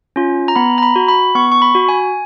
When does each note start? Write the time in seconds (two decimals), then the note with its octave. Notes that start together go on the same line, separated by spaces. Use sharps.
0.16 C#4 F4
0.48 A#5
0.56 B3 B5
0.78 A#5
0.83 B5
0.96 F#4
1.08 B5
1.35 B3 C#6
1.52 C#6
1.62 B5
1.75 F#4
1.89 G#5